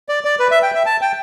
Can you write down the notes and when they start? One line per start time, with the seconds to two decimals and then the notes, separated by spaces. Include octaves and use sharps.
0.09 D5
0.25 D5
0.40 B4
0.51 E5
0.63 G5
0.75 E5
0.86 A5
1.01 G5